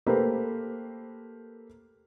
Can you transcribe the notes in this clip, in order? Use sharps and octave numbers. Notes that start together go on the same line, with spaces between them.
A3 A#3 G4 B4 C5